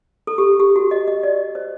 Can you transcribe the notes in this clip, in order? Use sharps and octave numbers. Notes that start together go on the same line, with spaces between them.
A4
G4
G4
F#4
D#5
D#5
D5
C5